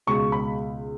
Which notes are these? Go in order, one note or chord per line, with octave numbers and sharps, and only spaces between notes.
C#2 B2 G#3 C#6
B5